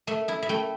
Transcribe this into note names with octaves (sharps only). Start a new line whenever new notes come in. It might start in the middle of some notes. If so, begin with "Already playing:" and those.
A3 E5
E4 E5
E5
A3 G5